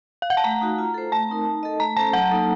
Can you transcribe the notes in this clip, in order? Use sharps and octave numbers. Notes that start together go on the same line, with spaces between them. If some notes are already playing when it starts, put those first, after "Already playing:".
F5
F#5
A5
A3 A#5
D#4 F#4
F4
A4 C5
A3 A5
C4 D#4 A#4
D#4
A4 D#5
A3 A#5
C#4 A4 C5 A5
F#3 F#5
A#3 D#4 A4